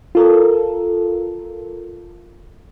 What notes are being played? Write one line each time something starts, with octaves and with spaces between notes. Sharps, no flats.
F4 A4 A#4